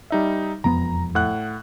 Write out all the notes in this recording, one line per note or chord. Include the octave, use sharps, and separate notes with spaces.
G3 D#4 E5
E1 F2 B3 A#5
A2 F#5 F#6